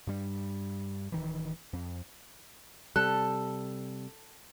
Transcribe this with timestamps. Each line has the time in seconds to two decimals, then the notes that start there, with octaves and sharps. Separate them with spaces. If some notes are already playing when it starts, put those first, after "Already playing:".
0.07 G2 G3
1.12 D1 D#3 E3
1.73 F2
2.96 C3 G3 A4 F#6